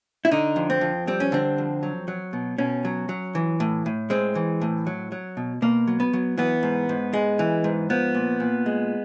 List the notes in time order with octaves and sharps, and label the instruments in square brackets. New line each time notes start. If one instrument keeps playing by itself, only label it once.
[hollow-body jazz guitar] E4
D3 D#4
F2
C4
F2
G3 C4
C#4
D3 C4
F2
F#3
F#3
B2
B2 C#4
F#3
F#3
E3
A2
A2
G#3 C4
E3
A2
F#3
F#3
B2
B2 A#3
F#3
B3
F#3
E3 B3
G#2
G#2
G#3
E3
G#2
F3 B3
A#2
A#2
G#3